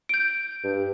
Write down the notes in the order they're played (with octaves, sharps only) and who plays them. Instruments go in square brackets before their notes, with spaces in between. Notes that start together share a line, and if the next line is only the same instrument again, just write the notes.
[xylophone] G6 D7
[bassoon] G2